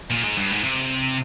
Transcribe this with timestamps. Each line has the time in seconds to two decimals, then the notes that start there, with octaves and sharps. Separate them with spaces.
0.11 A#2
0.24 G#2
0.38 G2
0.51 G#2
0.64 C3